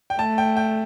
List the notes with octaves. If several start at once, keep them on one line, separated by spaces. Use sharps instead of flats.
G5
A3 A5
G5
G5